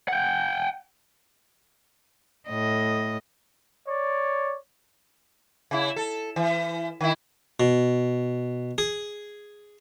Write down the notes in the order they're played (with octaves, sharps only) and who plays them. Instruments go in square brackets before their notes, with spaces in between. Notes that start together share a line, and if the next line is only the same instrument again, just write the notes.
[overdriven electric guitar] F#5 G5
[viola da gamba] A2 D#5
[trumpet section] C#5 D5
[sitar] C#3 E4
A4
E3
D#3 E4
[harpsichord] B2
G#4